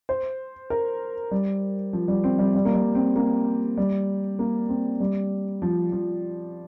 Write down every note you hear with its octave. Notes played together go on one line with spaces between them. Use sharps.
C5
A#4
G3
F3
G3
C4
G3
G3
A#3
G3
C4
A#3
G3
A#3
C4
G3
F3
F3